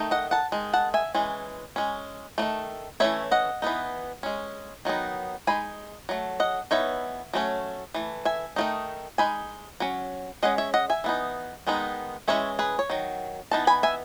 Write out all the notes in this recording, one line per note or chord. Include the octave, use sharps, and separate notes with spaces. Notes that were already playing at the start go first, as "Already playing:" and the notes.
Already playing: D#3 A3 D#4
D#5 F#5
F#5 A5
D#3 G#3
F#5 A5
E5 G#5
E3 G#3 C#4
G#3 C#4
D#3 F#3 A3
E3 A3 C#4 C#5 E5
D#5 F#5
E3 B3 D#4
G#3 C#4
D#3 F#3 B3 D#4
G#3 D#4 G#5 B5
F#3 A3
D#5 F#5
E3 B3 D#4 C#5 E5
F#3 A3 C#4
E3 A3
E5 G#5
D#3 F#3 A3 D#4
G#3 D#4 G#5 B5
F#3 C#4
G#3 C#4 D#5 F#5
C#5 E5
D#5 F#5
E5 G#5
E3 B3 D#4
D#3 G#3 B3 D#4
E3 G#3 C#4 C#5 E5
G#4 B4
C#5
D#3 F#3
E3 B3 D#4 A5
G#5 B5
E5 G#5